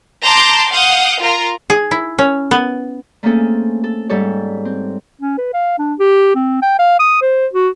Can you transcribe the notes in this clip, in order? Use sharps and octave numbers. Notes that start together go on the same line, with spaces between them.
A5 A#5 C6 D6 G6
F5 F#5 D#6 G6
F4 A#4 A#5
G#4
E4
C#4
B3
A3 A#3 C4 C#4 G#4 A4
A4
G#2 G3 A4 C#5
C4
C#4
B4
F5
D4
G4
C4
G5
F5
D#6
C5
F#4